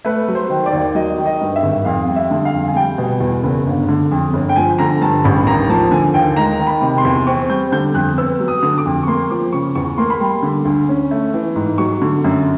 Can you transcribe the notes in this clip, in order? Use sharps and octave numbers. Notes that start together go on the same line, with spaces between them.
A3 B4
F#3
C5
D#3
D5
D#2
F#3 D#5
D#3
D#5
G2
E5
G#1
F2 F5
G3
E5
D3
F5
F2
G#5
G3 G5
B2
E2
F#1
G1
D3
F2
G1
G5
F3 G#5
D3 A#5
G2 A5
A1 B5
D#2 A#5
F3 A5
D3 G#5
D#2 G5
G#3 A#5
D#3
B5
C3
C6
E2
C4 C#6
G3 G6
D3 G6
F2 F#6
B3 E6
F#3
D#6
D3
D6
F2
C#6
A#3 C6
F3 D6
C#3 C#6
E2 C#6
A#3 C6
B5
G3 C6
D3
D2
C#4
A3
E3
G#2
F#3 C#6
D3
F#2